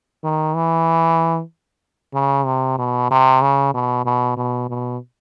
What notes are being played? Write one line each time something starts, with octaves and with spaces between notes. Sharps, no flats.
D#3
E3
C#3
C3
B2
C3
C#3
B2
B2
B2
B2